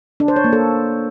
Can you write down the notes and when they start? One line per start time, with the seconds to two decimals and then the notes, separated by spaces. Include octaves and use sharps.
0.20 D4
0.28 C5
0.36 C#5
0.44 A#3
0.53 A4